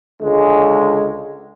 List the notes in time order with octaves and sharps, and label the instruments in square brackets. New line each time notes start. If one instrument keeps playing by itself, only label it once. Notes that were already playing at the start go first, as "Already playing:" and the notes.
[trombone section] C#2 D3 G#3